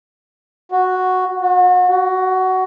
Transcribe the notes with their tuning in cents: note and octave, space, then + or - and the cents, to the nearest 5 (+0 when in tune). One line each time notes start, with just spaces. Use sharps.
F#4 +0
F#4 -35
F#4 +15